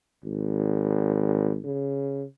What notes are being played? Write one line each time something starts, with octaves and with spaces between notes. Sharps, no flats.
G#1
C#3